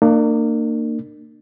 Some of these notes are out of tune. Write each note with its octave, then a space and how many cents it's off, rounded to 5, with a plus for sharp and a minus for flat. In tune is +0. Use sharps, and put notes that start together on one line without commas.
A#3 -25 D4 +40